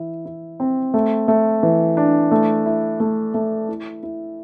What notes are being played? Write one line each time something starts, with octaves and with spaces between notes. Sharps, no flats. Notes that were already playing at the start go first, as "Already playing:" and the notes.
Already playing: E3 E4
E4
C4
A3
A3
E3
D4
A3
E4
A3
A3
E4
E4